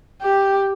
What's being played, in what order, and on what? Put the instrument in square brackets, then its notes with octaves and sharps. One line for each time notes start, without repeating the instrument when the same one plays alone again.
[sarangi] G4